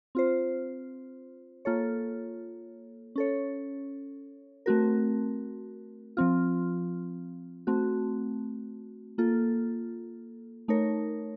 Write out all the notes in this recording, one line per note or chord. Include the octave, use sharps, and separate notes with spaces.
C4 F4 C5
A#3 F4 A4 C#5
C#4 A4 C#5
A3 C4 F#4 A#4
F3 C4 F4
A3 C4 F#4
A#3 F4 A4
A3 D#4 A#4 C#5